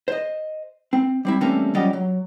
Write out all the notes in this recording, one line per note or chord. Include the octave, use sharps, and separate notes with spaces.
C5 D#5
C4
G3 C4 E4
E3 G3 A3 A#3 C4 C#4
F#3 G3 C#4 F4 D5 D#5
F#3